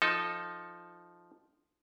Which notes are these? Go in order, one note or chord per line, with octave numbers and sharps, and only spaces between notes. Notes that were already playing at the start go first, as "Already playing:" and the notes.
F3 D#4 A4